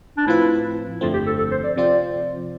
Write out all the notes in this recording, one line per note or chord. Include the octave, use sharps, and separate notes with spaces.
D4
A2 F3 C4 E4 F4 B4
G1 F2 D3 A3 C4 F4
G4
A4
A4
C5
D5
C3 F3 C4 F4 C5 D5